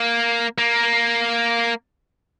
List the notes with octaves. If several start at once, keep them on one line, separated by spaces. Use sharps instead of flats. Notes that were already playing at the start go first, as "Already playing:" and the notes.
Already playing: A#3
A#3